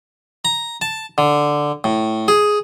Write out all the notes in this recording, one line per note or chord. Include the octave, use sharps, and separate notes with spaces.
A#5
A5
D3
A2
G#4